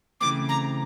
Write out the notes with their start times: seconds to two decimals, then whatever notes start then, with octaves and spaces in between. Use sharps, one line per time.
0.21 C#3 E3 A3 C4 D6
0.49 A#5